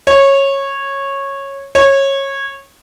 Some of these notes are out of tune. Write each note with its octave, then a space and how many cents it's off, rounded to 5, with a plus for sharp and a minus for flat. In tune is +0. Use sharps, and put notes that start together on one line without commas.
C#5 -15
C#5 -20